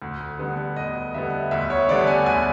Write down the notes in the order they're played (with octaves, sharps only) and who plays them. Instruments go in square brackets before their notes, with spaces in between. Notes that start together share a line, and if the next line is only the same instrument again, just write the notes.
[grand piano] D2
D3 G3 B3
D2 D#5
D3 G3 B3 E5
D2 E5
C#5
D3 G3 B3 D5
G#5
D2 G#5